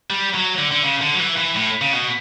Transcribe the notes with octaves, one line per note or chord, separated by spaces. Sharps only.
G3
F#3
D3
D3
C#3
D3
F#3
E3
E3
A2
C#3
B2